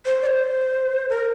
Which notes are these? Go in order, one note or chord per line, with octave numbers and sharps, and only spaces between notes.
C5
D5
C5
A#4